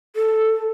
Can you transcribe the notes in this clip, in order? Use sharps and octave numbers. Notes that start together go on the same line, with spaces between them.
A4